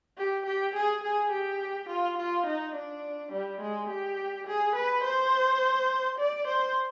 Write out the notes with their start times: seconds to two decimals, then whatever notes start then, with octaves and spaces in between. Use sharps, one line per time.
0.18 G4
0.46 G4
0.75 G#4
1.04 G#4
1.32 G4
1.90 F4
2.18 F4
2.47 D#4
2.75 D4
3.33 G3
3.61 G#3
3.90 G4
4.47 G#4
4.76 B4
5.04 C5
6.19 D5
6.48 C5